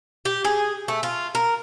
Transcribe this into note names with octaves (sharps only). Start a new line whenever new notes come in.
G4
G#4
A3
F4
A#4